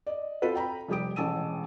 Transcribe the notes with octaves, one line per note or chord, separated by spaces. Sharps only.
D5 D#5
C4 F4 F#4 A4 B4
G5 A#5 B5
F1 G3 G4 D#6 D7
E1 A1 A5 E6 D#7